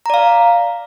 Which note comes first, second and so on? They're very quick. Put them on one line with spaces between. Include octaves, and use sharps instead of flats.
A#5 D5 F5